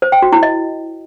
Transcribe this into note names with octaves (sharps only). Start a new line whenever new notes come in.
C5
G5
F#4
E4
D#5